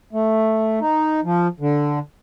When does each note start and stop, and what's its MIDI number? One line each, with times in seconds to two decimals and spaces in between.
0.13 0.79 57
0.81 1.20 63
1.24 1.47 53
1.60 1.99 50